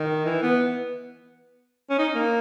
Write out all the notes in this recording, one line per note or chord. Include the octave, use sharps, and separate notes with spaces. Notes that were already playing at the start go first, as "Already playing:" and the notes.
Already playing: D#3
E3
B3
C#4
D#4
A#3